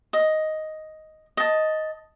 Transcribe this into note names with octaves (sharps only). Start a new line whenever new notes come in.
D#5
D#5 A5